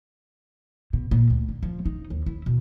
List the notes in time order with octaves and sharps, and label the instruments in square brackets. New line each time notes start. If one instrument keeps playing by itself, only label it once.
[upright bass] B2
A#2
D2
D3
F3
D#4
D#2
E4
B2